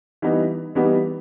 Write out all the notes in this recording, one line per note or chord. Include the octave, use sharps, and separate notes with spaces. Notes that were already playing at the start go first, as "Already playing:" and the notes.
E3 G3 B3 D#4
E3 G3 B3 D#4